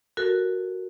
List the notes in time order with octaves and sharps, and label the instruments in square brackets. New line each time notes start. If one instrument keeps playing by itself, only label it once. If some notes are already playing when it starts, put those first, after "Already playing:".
[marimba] F#4 A4 A#4